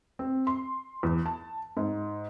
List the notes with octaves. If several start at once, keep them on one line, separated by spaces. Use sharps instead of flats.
C4
C6
E2
A5
G#2